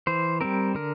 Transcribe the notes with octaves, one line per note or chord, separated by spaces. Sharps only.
E3 C5
G3 C4 A#4
D3 A#4